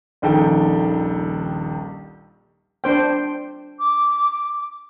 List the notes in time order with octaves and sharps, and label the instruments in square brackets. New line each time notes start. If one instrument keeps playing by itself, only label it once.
[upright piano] D#1 A#1 D#3 A4 G5
[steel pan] D4 C5 G5
[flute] D6